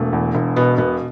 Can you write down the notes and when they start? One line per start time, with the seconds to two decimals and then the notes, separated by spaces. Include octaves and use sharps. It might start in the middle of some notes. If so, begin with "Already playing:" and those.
Already playing: E1 A3
0.13 E2
0.35 E1
0.56 B2 B3
0.78 E1 B3